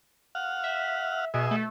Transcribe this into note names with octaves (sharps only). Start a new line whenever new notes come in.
F5 F#5
E5
B2 G#4 D#5 E5
A3